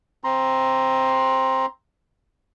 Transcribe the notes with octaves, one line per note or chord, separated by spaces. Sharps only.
C4 A#5 C6